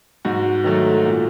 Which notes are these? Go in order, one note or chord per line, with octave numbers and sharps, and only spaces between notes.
G#2 F#4
D#3 F#3 A3
A#2